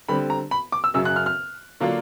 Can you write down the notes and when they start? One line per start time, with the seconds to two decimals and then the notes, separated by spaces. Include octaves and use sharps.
0.09 D3 G3 C4 B5
0.30 A#5
0.51 B5
0.72 D6
0.84 E6
0.94 F#2 C#3 F#3 E6
1.05 F#6
1.16 F6
1.26 F6
1.80 D3 F#3 A#3 D4 F4